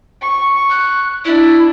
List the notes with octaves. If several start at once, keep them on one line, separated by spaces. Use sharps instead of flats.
C#6
F#6
D4 E4 E5